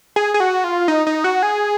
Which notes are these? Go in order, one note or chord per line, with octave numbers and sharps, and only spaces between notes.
G#4
G#4
F#4
F4
D#4
D#4
F#4
G#4